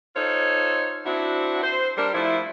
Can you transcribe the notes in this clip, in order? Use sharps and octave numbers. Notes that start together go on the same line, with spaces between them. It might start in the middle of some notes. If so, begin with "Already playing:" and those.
D#4 F4 A4 C5 C#5
C4 D4 E4 F#4
C5
G3 D4 G4 A#4
F3 A3 E4